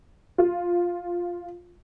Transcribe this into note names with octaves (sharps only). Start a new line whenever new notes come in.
F4